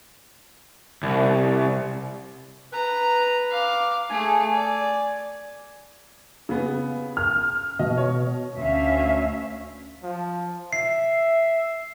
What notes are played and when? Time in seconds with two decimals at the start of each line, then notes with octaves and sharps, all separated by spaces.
1.03 C2
2.73 B4 A#5
3.51 F5 D6
4.10 A3 G#4 G#5
4.53 D5
6.49 C#3 B3
7.17 F6
7.79 B2 D#5
7.98 C#5
8.57 D2 C#4 E5 F5
10.03 F3
10.73 E5 C7